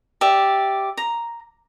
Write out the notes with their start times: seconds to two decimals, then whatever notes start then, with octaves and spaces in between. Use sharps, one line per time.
0.21 G4 D5 E5
0.97 A#5